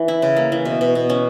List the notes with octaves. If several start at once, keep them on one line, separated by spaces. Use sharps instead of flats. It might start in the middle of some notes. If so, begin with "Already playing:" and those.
Already playing: E3
E4
C#3
A#3
E3
B2
B2
B2
C#4